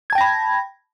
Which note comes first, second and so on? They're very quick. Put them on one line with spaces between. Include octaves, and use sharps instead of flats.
G#6 A5 G5 A#6 B5